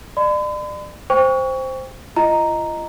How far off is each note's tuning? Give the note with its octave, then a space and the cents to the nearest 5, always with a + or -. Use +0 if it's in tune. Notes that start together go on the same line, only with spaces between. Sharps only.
D5 +35 B5 +45
C5 +0 G5 +30 C#6 +25
F4 -40 D#5 +0 A#5 +0